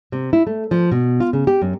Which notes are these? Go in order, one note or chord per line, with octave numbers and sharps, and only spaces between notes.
C3
E4
A3
F3
B2
F4
C#3
G4
F#2